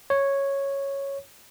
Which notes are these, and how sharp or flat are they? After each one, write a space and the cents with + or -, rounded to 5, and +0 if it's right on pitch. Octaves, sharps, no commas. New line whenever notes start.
C#5 -5